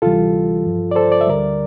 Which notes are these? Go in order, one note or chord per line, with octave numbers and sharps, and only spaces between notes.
D2 C3 E3 G3 F4 A4
G2 F3
D5
A4 C5
D5
E5
D2 D3 G3 A#4 D5